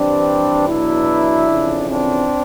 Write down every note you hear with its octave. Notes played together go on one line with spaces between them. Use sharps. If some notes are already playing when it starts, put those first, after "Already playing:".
Already playing: G2 E3 G3 C4 D4
E2 B2 F#3 D4 E4
F2 C#3 E3
C4 D4